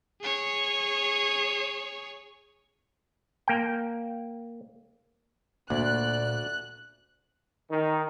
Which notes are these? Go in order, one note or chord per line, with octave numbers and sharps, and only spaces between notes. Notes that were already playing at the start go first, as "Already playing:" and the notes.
G#4 C#5
A#3 G5
D2 A#2 A#3 D5 F#6
D#3